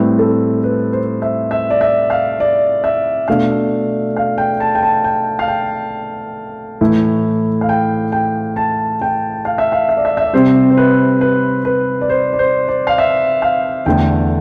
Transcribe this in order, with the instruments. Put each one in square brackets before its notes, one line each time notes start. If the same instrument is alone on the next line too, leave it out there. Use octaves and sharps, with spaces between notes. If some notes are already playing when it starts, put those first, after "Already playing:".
Already playing: [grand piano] A2 G3 C4 E4 B4
A4
B4
C5
E5
E5
D5
E5
F5
D5
E5
B2 A3 D4 F5
F5
G5
A5
G5
A5
G5
F5
G5
A2 E3 A3 E4
F5
G5
G5
A5
G5
F5
E5
F5
E5
D5
E5
E5
D5
C3 G3 C4 C5
C5
B4
B4
B4
D5
C5
D5
C5
D5
F5
E5
F5
E2 D3 A3 G5